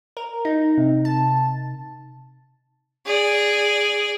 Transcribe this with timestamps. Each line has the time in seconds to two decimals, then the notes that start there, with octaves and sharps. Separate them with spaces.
0.17 A#4
0.45 D#4
0.77 C3
1.05 A5
3.06 G#4 D5